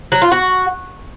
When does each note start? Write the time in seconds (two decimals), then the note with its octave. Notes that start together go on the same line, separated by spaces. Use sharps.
0.12 F#3
0.22 F4
0.32 F#4